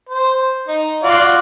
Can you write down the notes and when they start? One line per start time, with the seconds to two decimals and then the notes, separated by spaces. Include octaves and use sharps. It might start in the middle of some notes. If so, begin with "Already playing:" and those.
0.09 C5
0.68 D#4
1.04 F4 F#4 D5